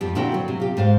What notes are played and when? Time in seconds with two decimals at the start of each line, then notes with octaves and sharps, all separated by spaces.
0.01 F2 F3 G4
0.15 A#2 D3 C4 E4 F#4 G5
0.34 F#3
0.48 C3
0.60 F4 G4
0.77 G#2 C5 F5